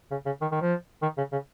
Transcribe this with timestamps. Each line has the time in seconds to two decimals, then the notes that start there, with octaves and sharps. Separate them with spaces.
0.11 C#3
0.26 C#3
0.41 D#3
0.52 D#3
0.61 F3
1.02 D#3
1.18 C#3
1.32 C#3